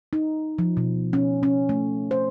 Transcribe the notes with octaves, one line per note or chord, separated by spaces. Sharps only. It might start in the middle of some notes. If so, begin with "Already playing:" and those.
D#4
F3
B2
C#4
C#4
A3
C5